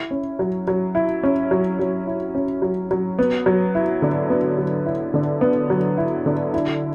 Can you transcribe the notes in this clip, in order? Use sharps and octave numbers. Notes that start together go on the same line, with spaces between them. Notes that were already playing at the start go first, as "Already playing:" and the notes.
Already playing: E4
C#4
F#3
F#3
E4
C#4
F#3
F#3
E4
C#4
F#3
F#3
B3
F#3
E4
D3
B3
F#3
E4
D3
B3
F#3
E4
D3
E4